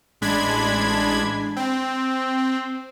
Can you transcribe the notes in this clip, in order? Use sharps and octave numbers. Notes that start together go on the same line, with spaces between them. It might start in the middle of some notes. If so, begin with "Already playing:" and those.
A1 G#3 D4 B5 G#6
C4